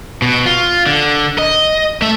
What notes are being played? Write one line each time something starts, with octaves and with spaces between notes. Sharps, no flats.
B2
F4
D3
D#5
A3 E5